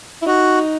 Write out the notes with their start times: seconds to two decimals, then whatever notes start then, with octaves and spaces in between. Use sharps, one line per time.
0.22 E4
0.27 D#4 F#4